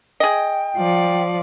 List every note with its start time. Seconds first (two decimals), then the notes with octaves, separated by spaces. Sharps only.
0.20 G#4 D#5 G5
0.77 F3 D5